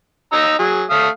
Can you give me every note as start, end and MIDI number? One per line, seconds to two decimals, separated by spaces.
0.33 0.54 63
0.33 0.54 82
0.33 0.54 88
0.59 0.84 54
0.59 0.84 68
0.90 1.08 57
0.90 1.08 77
0.90 1.08 87